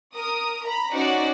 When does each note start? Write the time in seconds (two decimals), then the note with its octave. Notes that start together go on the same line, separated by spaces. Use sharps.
0.14 A#4 D#6
0.64 A#5 B5
0.92 C#4 D#4 F#4 C5 D5 F#5